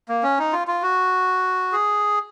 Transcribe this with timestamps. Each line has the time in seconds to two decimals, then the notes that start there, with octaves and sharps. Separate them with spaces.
0.08 A#3
0.23 C#4
0.39 D#4
0.53 F4
0.67 F4
0.82 F#4
1.72 G#4